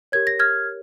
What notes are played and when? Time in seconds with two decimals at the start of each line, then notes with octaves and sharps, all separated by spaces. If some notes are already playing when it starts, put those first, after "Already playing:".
0.12 G4 A#4 C#5 G#6
0.27 A#6
0.40 F6 G#6